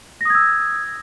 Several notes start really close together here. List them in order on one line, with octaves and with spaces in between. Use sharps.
A#6 D#6 G#6 E6